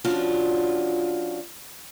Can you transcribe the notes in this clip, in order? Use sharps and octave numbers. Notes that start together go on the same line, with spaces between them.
F3 C#4 D4 F4 F#4